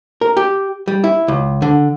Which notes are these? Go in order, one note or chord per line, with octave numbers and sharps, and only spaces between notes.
A#4
G4
G3
E4
C#2
D3